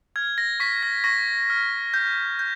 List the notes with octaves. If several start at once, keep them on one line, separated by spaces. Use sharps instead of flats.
F6 G#6
A#6
C#6 B6
A#6
C#6 A#6
F6
G6
G6